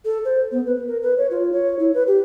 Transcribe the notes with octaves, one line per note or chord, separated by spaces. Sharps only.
A4
C5
B3
B4
A#4
B4
C#5
F4
C#5
E4
B4
G4